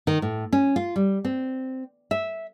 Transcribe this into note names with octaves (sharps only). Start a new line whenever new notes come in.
D#3
A2
C#4
F4
G3
C4
E5